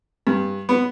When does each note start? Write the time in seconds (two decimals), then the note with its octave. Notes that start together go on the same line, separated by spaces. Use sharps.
0.27 G2
0.69 B3